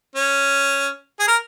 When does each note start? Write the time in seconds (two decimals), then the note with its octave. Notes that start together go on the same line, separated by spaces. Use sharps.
0.16 C#4
1.20 G#4
1.28 A#4